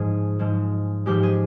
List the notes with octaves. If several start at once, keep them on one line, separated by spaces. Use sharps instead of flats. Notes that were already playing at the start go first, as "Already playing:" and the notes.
Already playing: G#2 F3 G#3 G#4
G#2 F3 G#3
G#2 F3 G#3 G4
G#4